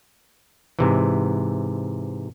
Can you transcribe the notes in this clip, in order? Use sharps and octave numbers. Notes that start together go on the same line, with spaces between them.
G#2 C3 E3